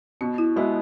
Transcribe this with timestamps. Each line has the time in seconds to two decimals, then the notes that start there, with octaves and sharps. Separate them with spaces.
0.21 B2 C#4
0.38 E4
0.56 G#3 B3 E4 F#4